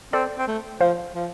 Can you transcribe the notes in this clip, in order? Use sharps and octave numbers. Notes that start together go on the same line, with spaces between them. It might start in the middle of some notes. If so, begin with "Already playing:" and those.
C4 A4 D5
C4
A3
F3 C5 F5
F3